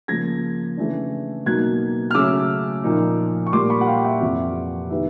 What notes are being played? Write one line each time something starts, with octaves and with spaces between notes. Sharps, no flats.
C#3 F3 A#3 G#6 A#6
C#3 E3 A3 D4
B2 F#3 A#3 D#4 F#6 G#6
F6
C#3 F#3 A3 C#4 D6 E6
A#2 F3 A#3 D#4
C#6
A#2 G3 A#3 C6 D6
B5 C#6
F#5
F5 G5
G5
E5 F#5
F2 C3 E3
D#3 G3 B3 E4 E5